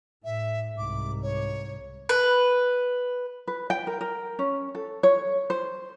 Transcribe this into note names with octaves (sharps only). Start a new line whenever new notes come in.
A2 E5
C2 G#2 D6
C#5
B4
B4
G5
A#4
A#4
C#4
A4
C#5
C5